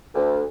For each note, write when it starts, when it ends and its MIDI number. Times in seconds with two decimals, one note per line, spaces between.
0.14 0.42 38